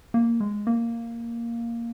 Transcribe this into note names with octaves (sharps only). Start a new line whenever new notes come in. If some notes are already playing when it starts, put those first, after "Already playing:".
A#3
G#3
A#3